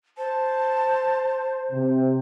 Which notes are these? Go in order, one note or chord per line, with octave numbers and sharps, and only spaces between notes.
C5 A5
C3